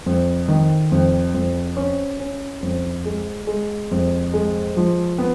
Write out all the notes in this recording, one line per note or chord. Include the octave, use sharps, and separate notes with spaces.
F2
D#3
F2
F2
C#4
C#4
F2
G#3
G#3
F2
G#3
F3
B3